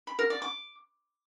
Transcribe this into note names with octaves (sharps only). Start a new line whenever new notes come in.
B5
A#4
D5
D6